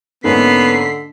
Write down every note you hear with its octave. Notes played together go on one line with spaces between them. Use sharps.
G#2 D3 A#3 B3 C#4 B6 C7